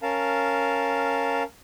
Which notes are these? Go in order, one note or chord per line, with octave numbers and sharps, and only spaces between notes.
C#4 A#4 F5 A5